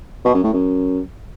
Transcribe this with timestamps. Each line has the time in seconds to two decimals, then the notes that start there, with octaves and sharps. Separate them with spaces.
0.25 B2
0.34 F#2
0.43 A2
0.53 F#2